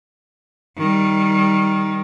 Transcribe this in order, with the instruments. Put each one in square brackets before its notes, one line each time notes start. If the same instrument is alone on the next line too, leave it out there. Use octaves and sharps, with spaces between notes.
[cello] D#3 G3